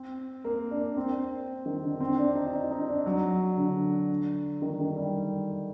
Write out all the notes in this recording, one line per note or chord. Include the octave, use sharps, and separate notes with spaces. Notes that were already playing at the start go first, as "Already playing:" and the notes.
Already playing: C4
A#3
D4
C4
D#3
D3
C4
D4
D#4
D#4
D#4
D4
F#3
D3
D#3
D#3
G3